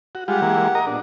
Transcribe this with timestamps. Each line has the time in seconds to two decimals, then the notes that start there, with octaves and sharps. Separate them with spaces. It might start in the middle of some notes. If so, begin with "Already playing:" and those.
0.15 F#4
0.28 G3 G#3 F4 G4 F#5
0.42 E3 G#3 A#3
0.75 A#4 D#5 A#5
0.87 A#2 B3 D4